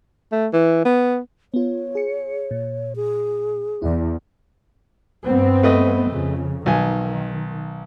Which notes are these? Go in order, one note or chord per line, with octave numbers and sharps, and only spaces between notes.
A3
E3
B3
B3 F4 C#5
G#4 C#7
A#2
G#4
E2 E4 D5
G2 B3 C4
A3 B4 D#5
F2 C#3
B1 D#3 G#5